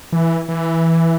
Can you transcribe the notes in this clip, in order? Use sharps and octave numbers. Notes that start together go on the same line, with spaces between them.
E3
E3